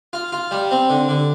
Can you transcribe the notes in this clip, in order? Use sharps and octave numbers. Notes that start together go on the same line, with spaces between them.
F4
F4
G3
C4
D3
D3